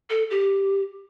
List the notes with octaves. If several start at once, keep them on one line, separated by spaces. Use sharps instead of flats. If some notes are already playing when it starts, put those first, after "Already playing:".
A4
G4